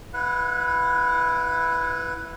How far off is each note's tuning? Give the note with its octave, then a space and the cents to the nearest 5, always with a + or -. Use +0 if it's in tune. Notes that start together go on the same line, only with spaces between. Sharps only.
E4 +0 B4 +0 F#5 -40